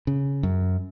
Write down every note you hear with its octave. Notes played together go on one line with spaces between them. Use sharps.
C#3
F#2